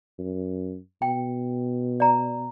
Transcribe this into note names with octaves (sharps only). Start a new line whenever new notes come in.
F#2
B2 G5
D5 A#5